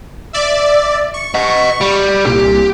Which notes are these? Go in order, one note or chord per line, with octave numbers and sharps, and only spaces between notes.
D5 E5
C#6
D#5 F#5
G3
C2 A#2 G4